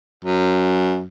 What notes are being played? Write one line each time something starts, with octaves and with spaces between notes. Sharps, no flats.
F#2